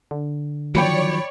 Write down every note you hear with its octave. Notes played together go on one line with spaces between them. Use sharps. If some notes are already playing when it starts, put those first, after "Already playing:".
D3
D#3 F3 F#3 C#5 D5 G5 B5 C#7